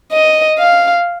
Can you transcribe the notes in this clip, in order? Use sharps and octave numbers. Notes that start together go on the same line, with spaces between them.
D#5
F5